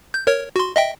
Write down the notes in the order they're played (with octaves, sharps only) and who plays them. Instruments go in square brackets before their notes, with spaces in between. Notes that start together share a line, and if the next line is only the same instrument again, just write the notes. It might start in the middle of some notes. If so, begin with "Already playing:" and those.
[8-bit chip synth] G6
A#4 C#5
F#4 C6
D#5 E5 G5